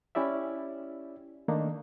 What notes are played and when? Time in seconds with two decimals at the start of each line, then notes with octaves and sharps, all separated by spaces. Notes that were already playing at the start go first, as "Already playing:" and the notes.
0.15 C#4 E4 G4 D5 E5
1.48 D#3 A3 A#3 D4 D#4